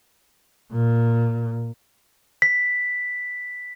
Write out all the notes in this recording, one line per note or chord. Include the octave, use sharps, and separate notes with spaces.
A#2
B6